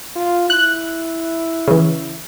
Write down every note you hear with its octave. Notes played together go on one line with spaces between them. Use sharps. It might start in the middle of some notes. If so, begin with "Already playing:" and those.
F4
E4 F#6
C#3 E3